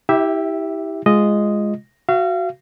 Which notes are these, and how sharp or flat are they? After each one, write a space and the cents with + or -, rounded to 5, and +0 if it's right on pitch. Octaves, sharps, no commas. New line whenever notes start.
E4 -30 G4 +0 E5 +0
G#3 +0 F4 -10 D#5 +0
F#4 +0 F5 -35